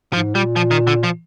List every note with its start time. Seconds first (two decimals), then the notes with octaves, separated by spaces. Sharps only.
0.13 G#2 F3
0.35 A#2 G3
0.56 F3
0.71 D#3
0.87 D3
1.04 F3